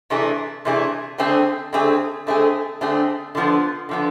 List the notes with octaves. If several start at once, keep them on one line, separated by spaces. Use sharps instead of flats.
C3 E3 A3 D4 G#4
C3 E3 A3 D4 G#4
D3 A3 C4 G#4
D3 A3 C4 G#4
D3 A3 C4 G#4
D3 A3 C4 G#4
D3 F3 B3
D3 F3 B3